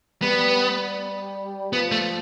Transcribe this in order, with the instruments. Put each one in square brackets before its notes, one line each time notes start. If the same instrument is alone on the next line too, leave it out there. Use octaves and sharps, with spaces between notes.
[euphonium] G3 [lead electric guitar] B3
[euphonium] F3 [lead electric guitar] B3
[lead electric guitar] A3